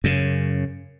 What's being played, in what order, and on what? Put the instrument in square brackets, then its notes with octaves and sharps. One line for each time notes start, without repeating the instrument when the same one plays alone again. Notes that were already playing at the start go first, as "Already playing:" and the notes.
[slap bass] F#2 C#3